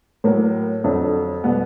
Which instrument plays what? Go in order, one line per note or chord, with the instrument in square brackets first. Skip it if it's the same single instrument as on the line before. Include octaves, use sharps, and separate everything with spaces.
[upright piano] A2 F#3 A#3
F2 D3 F#3
B2 G3 B3